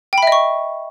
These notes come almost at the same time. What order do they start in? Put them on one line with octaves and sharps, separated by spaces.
G5 B5 E5 D#5 C#6